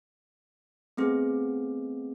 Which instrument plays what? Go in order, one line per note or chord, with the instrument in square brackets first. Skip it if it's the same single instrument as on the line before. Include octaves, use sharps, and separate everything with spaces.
[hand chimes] A3 B3 C4 G#4